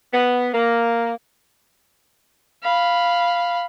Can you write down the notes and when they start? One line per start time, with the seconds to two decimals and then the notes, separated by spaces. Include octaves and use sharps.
0.13 B3
0.53 A#3
2.63 F5 B5